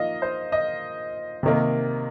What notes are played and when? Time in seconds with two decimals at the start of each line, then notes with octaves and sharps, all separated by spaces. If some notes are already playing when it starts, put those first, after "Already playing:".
Already playing: F3 A#3 D#4 D#5 F5
0.22 C5
0.52 D#5
1.43 C3 D#3 A#3